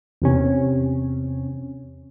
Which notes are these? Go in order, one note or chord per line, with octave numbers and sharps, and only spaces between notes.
E2 C3 C#4